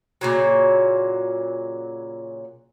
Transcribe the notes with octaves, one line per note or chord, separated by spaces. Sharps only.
A#2 C#3 F#3